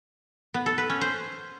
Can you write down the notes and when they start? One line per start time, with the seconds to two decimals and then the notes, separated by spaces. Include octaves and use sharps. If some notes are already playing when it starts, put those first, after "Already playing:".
0.54 B3
0.66 A4
0.78 B4
0.90 C#4
1.01 C5